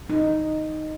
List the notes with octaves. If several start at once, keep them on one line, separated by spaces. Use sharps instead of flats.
D#4